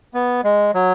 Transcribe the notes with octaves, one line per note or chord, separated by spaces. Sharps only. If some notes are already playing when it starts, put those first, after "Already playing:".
B3
G#3
F#3